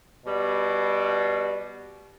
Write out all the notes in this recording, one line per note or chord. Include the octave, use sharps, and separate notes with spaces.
B2 G3